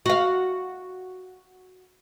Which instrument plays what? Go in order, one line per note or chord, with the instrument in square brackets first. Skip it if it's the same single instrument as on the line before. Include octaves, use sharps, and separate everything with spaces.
[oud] F#4 F5